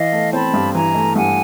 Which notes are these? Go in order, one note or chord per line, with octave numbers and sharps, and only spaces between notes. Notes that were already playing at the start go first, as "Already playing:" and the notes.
Already playing: E3 D#5 F5
A3
C4 A5 B5
G2
E3 G#5 A#5
A3
G2 F#5 G#5